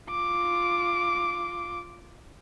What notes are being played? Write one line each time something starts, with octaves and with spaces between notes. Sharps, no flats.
F4 D6